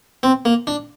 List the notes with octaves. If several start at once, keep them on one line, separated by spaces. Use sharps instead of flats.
C4
A#3
D4